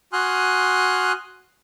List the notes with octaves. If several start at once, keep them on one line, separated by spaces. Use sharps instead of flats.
F#4 G#5 C6 D#6 F6 F#6